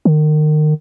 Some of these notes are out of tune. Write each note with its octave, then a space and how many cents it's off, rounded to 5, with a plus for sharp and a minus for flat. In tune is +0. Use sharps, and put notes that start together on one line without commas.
D#3 -30